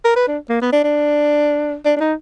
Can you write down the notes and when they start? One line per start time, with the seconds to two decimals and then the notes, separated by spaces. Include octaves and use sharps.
0.05 A#4
0.16 B4
0.28 D4
0.49 A#3
0.62 B3
0.73 D4
0.84 D4
1.85 D4
1.96 D4
2.00 D#4